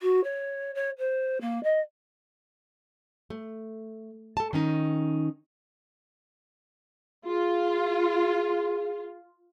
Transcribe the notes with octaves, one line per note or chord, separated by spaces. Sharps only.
F#4
C#5
C#5
C5
A#3
D#5
A3
A4 A5
D#3 C#4 D#4
F4 G#4